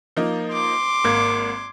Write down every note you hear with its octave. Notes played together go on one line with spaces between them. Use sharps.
F3 A#3 D#4
C6 D6
G#1 A#3 G#6